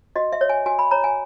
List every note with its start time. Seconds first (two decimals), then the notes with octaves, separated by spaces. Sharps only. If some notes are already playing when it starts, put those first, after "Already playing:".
0.16 F#4 D#5
0.32 E5
0.41 C#5
0.49 G#5
0.66 F#4 G#5
0.79 B5
0.91 C#5 A#5
1.04 G#5